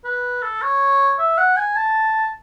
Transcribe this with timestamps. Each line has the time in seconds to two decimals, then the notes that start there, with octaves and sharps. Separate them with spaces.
0.05 B4
0.42 A4
0.62 C#5
1.19 E5
1.38 F#5
1.57 G#5
1.76 A5